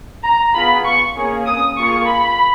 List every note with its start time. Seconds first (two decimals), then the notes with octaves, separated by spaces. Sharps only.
0.24 A#5
0.54 B3 F4 G#4 B5
0.85 C#6
1.16 A#3 C#4 G#4
1.47 D#6
1.78 A#3 F4 G#4 C#6
2.09 B5